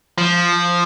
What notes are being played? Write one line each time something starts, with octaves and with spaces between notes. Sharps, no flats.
F3